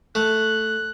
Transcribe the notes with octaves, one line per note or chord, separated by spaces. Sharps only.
A3 F#6